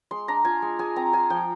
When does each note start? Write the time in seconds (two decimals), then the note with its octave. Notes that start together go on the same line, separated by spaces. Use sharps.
0.11 G#3 C6
0.28 D4 A#5
0.45 F4 G#5
0.62 G#3
0.79 G#3 G#5
0.96 C4 A#5
1.13 F4 G#5
1.30 F3 G5